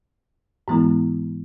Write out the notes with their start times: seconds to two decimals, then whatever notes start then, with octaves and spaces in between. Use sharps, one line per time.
0.68 G#2 E3 G#3 B3 E4